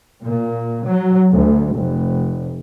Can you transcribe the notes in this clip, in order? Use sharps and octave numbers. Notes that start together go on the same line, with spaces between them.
A#2
F#3
D2
F1